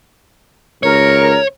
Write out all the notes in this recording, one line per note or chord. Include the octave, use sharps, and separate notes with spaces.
C#2 A#4 C#5